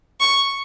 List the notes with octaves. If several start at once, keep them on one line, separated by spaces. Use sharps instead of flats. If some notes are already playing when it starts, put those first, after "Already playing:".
C#6